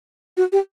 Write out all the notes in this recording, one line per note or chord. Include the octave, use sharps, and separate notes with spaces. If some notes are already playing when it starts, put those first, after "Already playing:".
F#4
G4